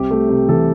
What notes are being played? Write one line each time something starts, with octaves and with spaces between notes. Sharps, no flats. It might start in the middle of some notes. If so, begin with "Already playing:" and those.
Already playing: C2 C4 G4
A3
C3
E3 A4